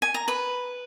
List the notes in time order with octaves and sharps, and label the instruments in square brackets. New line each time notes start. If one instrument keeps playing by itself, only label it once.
[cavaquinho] G#5
A#5
B4 B5